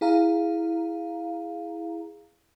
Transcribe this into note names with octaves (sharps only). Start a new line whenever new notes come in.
E4 G#4 F5 A#5